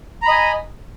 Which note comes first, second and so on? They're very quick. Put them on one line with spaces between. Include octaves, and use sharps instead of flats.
A#5 B5 D#5 G#5